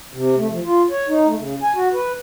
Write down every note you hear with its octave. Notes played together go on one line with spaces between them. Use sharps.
C3
A3
F3
F4
C#5
D#4
A3
C#3
G#5
F#4
B4